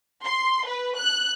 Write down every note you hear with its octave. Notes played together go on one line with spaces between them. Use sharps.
C6
B4
F#6